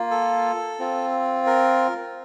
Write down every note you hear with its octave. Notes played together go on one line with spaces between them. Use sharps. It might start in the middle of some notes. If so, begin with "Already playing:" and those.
Already playing: A#3 F4
A4
C4 F4
A#4